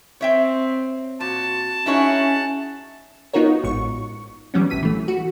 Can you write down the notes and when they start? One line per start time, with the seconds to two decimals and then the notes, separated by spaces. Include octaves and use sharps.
0.21 C4 C#5 E5 G5
1.20 A#2 F#4 A5
1.86 C#4 D#4 E4 G#4 C#5 F#5
3.34 B3 D#4 F4 F#4 A#4 C#5
3.64 A1 G#2 C#6
4.54 E3 F#3 G3 B3 C#4
4.70 A#1 A2 B6 D#7
4.83 E3 A3
5.08 F#4